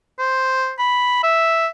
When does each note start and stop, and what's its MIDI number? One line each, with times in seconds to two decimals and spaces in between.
0.19 0.73 72
0.79 1.23 83
1.23 1.67 76